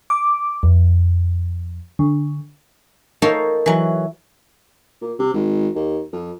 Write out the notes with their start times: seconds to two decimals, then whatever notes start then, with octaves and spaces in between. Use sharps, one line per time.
0.10 D6
0.63 F2
1.99 D3
3.22 D#4 F4 A4 A#4 C5 C#5
3.66 E3 F#3
5.01 A#2
5.19 C3
5.34 G#1
5.75 D#2
6.13 F2